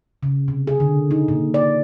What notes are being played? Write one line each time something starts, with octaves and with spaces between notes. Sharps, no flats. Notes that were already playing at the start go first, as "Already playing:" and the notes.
C#3
C3
G#4
D3
D#4
A#2
D5